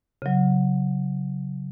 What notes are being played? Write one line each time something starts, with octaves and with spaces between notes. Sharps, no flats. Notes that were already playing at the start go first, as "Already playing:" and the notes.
C#3 F#3